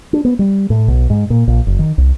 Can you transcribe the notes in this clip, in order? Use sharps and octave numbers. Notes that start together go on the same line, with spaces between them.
D4
B3
G3
A2
B1
G#2
A#2
A#1
F#1
D#3
C2